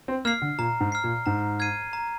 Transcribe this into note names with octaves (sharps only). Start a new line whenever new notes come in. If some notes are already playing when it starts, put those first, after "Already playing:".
C4
A#3 F6 C7
D3
A#2 A#5
G#2
F6 C7
A#2
G#2 A#5
F6 G#6 C7 D#7
A#5